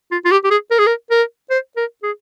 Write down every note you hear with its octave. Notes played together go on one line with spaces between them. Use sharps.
F4
F4
G4
G4
G#4
A#4
G#4
A#4
A#4
C5
A#4
G#4